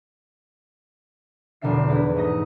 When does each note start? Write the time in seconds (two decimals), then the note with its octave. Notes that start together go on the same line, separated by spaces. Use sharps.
1.61 F1 E2 B2 D3 E5 C7
1.88 D4 E4 G#4 B4 C5
2.15 G#2 A3 D#4 D#5 A#6